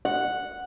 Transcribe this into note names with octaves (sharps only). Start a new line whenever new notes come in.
F#5